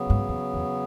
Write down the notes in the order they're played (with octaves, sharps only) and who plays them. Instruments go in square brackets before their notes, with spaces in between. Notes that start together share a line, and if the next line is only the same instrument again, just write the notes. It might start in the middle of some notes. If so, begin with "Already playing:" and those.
Already playing: [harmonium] C#3 F#3 B3
[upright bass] G#2
E2
E2